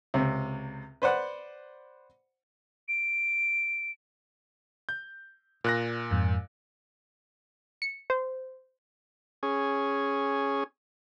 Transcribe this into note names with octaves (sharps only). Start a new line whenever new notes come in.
C#2 C3
B4 C5 D5 F#5
D7
G6
A#2 F#6 A#6
F2 G#2
C#7
C5
C#4 G#4